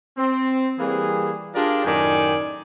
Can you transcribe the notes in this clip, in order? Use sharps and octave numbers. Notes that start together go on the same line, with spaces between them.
C4
E3 G3 A#3 G#4
D4 F4 G4 G#4 A#4 D5
F#2 A2 D#3 D5 G5 G#5